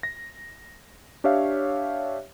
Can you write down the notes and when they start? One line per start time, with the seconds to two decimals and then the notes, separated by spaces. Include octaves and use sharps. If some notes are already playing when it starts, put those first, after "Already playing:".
0.03 A#6
1.24 D4 G4 C#5 E5 F5